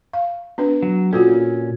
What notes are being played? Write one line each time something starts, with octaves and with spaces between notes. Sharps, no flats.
F5
B3 D4 B4
F#3
A#2 C#4 F4 F#4 A4